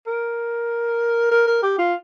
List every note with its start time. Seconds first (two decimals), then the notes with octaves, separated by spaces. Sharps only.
0.07 A#4
1.31 A#4
1.47 A#4
1.63 G4
1.78 F4